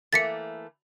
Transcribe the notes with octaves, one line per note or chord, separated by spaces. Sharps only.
E3 A3 A#3 A6 B6 C#7